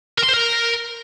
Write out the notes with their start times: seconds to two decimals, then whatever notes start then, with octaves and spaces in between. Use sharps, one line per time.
0.18 A#4
0.24 C6
0.29 C5
0.34 A#4